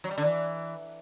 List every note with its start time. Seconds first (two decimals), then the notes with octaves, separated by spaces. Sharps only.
0.04 F#3
0.11 G3
0.18 D3
0.24 E3